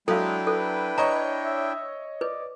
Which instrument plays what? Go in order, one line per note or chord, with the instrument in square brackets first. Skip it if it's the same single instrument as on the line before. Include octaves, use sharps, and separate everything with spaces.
[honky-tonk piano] F#3 [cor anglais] G#3 [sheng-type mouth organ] D4 E4 G5 [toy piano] A4 F5
[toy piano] A4 [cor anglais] B4
[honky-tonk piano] C#5 D#5 C#6 [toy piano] A#5
[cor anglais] E5
[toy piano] B4 [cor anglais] D5